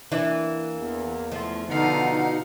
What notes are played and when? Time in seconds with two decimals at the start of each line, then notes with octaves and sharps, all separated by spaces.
0.12 E3 A#3 D4 E4
0.75 E2
1.32 F3 A3
1.70 B2 D3 B3 D#4 F5 F#5